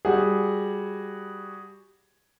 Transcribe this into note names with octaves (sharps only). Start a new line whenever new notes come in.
G3 F#4 G#4